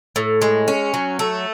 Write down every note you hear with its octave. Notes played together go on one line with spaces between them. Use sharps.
A2
G#3
C#4
F#3
A3